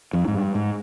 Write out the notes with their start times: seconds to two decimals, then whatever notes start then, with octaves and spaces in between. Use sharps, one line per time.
0.13 F2
0.28 G#2
0.34 G2
0.55 G#2